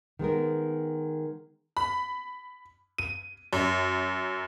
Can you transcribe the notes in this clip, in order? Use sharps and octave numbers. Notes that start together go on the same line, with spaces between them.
D#3 G#3 B3 A#4
B5
D#7
F#2